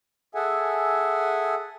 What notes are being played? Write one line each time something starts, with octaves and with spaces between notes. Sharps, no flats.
G#4 A4 E5 F#5 G#5